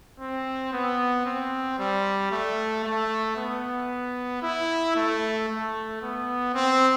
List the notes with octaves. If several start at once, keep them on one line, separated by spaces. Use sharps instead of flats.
C4
B3
C4
G3
A3
A3
B3
E4
A3
A3
B3
C4